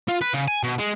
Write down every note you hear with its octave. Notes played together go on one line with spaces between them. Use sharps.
F4
B4
C#3
G#5
B2
G#3